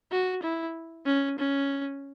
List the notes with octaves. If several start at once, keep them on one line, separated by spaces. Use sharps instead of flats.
F#4
E4
C#4
C#4